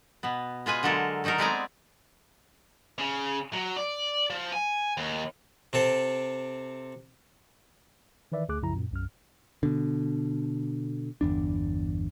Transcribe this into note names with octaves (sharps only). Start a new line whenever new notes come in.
B2 B3
G#3 F4 B4 G#5
D3 F#3 G#3 A4 A#4
D#3 F#3 D#4 A4 A#4
G#3 B3 C4 D5 G#5 A#5
C#3
F#3
D5
F3
G#5
D#2
C3 C4 A4
D#3 E3 B4 D5 E5
D2 A3 G#4 D6 F#6
C2 F#2 C#3 F3 E4 A#5
F#2 A#2
B1 F#2 F6
B2 D3
G1 E2 D4